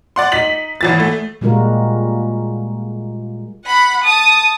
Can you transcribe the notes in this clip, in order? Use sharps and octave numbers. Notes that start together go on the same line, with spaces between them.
D5 F#5 C6
D#4 B6 F#7
G#1 E3 A6
A3
A#2 G3 G#3 F4 F#4 A#4
F#5 B5
A5 D#6